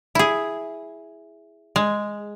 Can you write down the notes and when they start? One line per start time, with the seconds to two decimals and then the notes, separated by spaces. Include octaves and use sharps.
0.15 E4 G#4
1.76 G#3